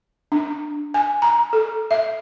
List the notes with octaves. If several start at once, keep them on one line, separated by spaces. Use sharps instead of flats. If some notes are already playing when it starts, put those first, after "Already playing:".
D4
G#5
A#5
A4
E5